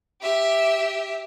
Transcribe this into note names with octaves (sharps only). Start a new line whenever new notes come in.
G4 E5